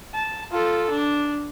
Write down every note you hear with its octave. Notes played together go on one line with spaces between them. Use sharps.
A5
F4 A4
D4